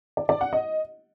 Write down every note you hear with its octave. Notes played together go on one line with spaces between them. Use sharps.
D5
D5
F#5
D#5